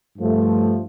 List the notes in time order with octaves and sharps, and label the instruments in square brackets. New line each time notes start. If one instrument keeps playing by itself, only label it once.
[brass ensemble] G2 F3 A3